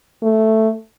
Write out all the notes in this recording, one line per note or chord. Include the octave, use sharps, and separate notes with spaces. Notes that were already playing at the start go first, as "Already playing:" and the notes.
A3